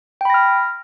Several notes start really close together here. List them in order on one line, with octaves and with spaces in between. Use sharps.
G5 B5 A#6 F6